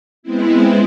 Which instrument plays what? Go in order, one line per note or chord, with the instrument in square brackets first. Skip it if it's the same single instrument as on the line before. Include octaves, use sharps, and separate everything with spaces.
[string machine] G#3 B3 C4 E4